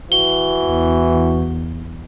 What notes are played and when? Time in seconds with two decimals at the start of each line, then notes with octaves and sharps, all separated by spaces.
0.12 E3 F#4 G7
0.65 E2